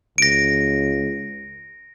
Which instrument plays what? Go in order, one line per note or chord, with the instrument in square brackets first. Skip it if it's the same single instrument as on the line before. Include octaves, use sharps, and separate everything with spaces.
[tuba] C#2 [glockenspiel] A#6 D7